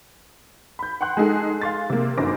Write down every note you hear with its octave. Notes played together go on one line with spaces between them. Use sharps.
B5 G6
F#5 G5 C6 F#6
G#3 D#4 G#4 A4
F5 C6 A6
C3 A#3
G1 F#2 D#4 C5 D6 A#6